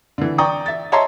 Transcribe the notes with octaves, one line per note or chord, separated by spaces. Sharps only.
D3 E3
D5 G5 A#5 C#6 D#6
E5 A6
C#5 D#5 E5 A5 A#5 C6